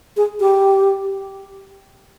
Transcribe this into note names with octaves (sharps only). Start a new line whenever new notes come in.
G#4
G4